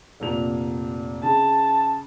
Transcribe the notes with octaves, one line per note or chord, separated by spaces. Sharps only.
F1 A#2 F7
C#3 A5